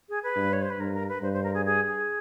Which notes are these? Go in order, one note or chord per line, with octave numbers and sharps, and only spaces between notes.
G#4
B4
G2
C#5
C5
B4
G2 A#4
A#4
B4
G2 C5
C5
A#4
G#4
G#4
G#4